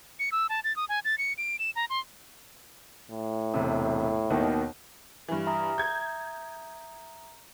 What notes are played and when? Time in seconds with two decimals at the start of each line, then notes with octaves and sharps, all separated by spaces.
0.19 C#7
0.32 E6
0.49 A5
0.64 A6
0.76 D#6
0.89 G#5
1.05 A6
1.18 C#7
1.38 D7
1.59 E7
1.76 A#5
1.90 C6
3.10 A2
3.54 E1 C3
4.30 D#2 B2 D#3
5.28 G2 E3
5.47 E5 A#5 D#6
5.78 G6 G#6